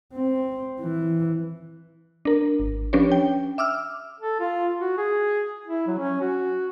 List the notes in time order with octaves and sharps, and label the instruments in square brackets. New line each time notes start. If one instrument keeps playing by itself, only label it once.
[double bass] C4
E3
[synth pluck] D4 A#4
G#1
F3 C#4 D4 G4 B4 C#5
G5
E5 D6 E6 F6
[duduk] A4
F4
F#4
G#4
E4
F#3
C#4
F#4